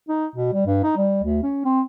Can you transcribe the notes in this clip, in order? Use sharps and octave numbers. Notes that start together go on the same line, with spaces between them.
D#4
B2
G3
G2
D#4
G3
D2
C#4
C4